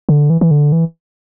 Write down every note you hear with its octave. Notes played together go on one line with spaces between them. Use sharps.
D3
E3
E3
D3
E3